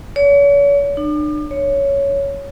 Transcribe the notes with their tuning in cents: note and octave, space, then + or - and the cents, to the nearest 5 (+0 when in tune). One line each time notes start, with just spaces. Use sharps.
C#5 +40
D4 +40
C#5 +5